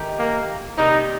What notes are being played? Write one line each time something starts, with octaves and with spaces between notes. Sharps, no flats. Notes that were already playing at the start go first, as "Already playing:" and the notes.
Already playing: D#3 A3 D#4 G4
A#3
C3 D#3 G3 A#3 D#4